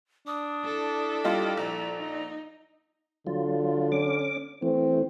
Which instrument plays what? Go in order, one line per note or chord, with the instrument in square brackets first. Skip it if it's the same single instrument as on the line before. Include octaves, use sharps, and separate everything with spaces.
[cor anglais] D4 [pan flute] D#6
[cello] E4 A4
[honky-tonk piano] G3 F4 D#5 [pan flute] G5
[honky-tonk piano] A#1 [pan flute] A#5
[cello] D#4
[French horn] D3 [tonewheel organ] F#3 F4
[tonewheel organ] C#4 D6
[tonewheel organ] E3 A3 [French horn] C4